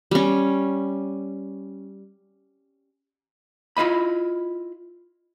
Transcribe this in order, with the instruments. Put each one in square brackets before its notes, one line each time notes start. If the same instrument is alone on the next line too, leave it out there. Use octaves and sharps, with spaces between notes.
[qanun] G3 C#4
[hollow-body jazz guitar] E4 F4 D#5 B5